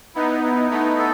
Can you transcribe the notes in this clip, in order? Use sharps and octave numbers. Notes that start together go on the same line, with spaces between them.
B3 D#4 E4
E4
A3 B3 D#4
A4